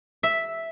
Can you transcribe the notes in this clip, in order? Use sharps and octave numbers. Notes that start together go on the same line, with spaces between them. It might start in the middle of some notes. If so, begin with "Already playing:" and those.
E5